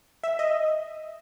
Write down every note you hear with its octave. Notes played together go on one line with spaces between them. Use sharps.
E5
D#5